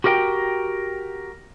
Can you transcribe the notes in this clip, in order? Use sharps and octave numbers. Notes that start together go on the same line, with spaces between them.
F#4 G4 A#4 D#5 G5